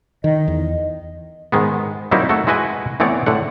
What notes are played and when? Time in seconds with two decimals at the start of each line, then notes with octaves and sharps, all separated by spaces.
0.24 D#3 D#5
0.48 E2
1.52 G#2 D#3 G#3 B3
2.11 F#3 G3 A#3 C4 D#4 E4
2.29 A3 F#4 A4
2.47 G#3 E4 F#4 B4 D#5 G#5
3.00 E3 A3 B3 C4 C#5 D5
3.26 A2 D3 F#5